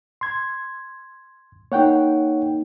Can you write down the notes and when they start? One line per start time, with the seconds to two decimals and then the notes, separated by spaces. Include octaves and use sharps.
0.21 C6 G#6
1.72 A#3 D#4 C#5 F#5 G5